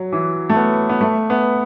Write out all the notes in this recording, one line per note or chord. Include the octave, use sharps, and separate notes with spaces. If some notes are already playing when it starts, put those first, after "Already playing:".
Already playing: F#3
E3
A3
B3
B3
A3
B3